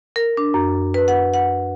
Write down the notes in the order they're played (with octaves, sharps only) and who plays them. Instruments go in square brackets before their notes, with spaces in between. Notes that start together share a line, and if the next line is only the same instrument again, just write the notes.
[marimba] A#4
D4
F#2
B4
F#5
F#5